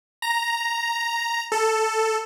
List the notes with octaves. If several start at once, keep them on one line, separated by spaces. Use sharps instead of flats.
A#5
A4